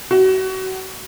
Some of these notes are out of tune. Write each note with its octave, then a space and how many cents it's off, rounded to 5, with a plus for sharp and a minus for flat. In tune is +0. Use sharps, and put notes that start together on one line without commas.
F#4 +30